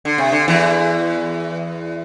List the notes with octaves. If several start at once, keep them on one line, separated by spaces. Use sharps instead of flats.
D3
C3
D3
E2 E3